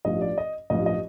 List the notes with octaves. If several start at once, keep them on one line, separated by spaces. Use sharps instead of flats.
A1 G2 F3 D#5
D5
D#5
A1 G2 F3 D#5
D#5